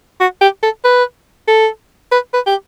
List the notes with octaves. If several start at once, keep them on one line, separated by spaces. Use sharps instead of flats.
F#4
G4
A4
B4
A4
B4
B4
G4